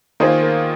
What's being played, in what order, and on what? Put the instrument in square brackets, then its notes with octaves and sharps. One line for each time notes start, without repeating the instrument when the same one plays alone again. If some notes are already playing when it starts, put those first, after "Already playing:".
[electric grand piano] D#3 A#3 F4 G#4 [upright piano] C5
[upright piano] A#4